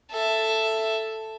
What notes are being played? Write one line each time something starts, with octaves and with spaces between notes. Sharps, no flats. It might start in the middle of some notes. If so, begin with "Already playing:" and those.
A4 E5